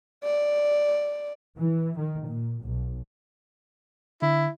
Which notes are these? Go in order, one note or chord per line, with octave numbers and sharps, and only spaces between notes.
D5
E3
D#3
A#2
B1
D3 E4